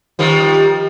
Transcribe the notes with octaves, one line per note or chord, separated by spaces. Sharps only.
D#3 F3 G3